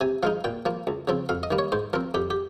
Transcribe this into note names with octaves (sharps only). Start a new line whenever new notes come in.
C3 G#5
F3 G#3 D#4 F5
A#2 G5
F3 A#3
C#2
C#3 F3 C4
F2 F5
D#5
D#3 G3 A#3
C#5
G#2 C5
F3 C4 A#4
F2 G4
G4